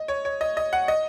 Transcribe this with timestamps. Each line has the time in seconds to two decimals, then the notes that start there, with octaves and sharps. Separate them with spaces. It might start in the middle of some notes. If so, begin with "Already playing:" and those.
Already playing: D#5
0.08 C#5
0.25 C#5
0.41 D#5
0.57 D#5
0.73 F#5
0.88 D#5